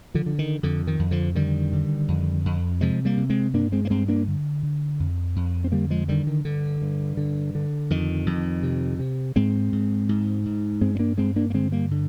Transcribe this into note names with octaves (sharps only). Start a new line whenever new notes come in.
D3 F3
D3
D#3
F2 D3
D#3
F2
D3 F3
D3 D#3 G3
D3
F2
F2
C3 F3 G#3
G3 A#3
C3
G#3 C4
G2 A#3 D4
G#3 C4
A#3
G2 G#3 C4
A#3 D4
D3
D3
F2
F2
C4
D3 G3 A#3
F3 G#3
D3 D#3 G3
D#3
G2 D3
G2
D3
D3
F2 D#3
F2
C3
C3
G#2 G#3 C4
G#2
G#2
G#2
G2 G#3 C4
C4
A#3 D4
G2 G#3 C4
A#3 D4
A#3
D3 G#3 C4
G3 A#3
D3